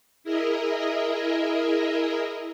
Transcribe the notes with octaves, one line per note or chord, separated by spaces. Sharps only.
E4 G#4 A#4 D#5 E5